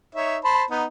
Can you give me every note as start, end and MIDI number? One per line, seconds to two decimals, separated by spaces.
0.15 0.38 63
0.15 0.38 73
0.15 0.38 76
0.44 0.64 72
0.44 0.64 81
0.44 0.64 83
0.70 0.85 59
0.70 0.85 63